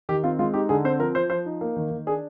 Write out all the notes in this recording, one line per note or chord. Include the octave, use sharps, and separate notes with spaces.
D#3 G4
C4 F4
G#3 F4
D#4 G4
D3 G#4
C4 C5
F3 A#4
F3 C5
F3 C5
D#4
A#3
D#3
D#3
D4 G#4